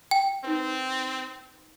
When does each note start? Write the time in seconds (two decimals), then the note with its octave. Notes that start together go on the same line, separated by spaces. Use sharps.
0.11 G5
0.44 C4 D#4 B4